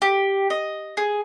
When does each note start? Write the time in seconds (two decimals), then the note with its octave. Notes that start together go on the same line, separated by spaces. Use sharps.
0.02 G4
0.50 D#5
0.97 G#4